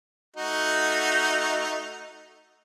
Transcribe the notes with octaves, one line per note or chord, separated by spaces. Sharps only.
A3 D#4 F#4